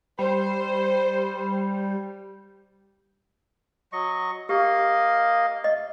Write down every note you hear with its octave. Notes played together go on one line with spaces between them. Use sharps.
G3 C5
F#3 D#5 C#6
A#3 G4 D#5 F5
D#5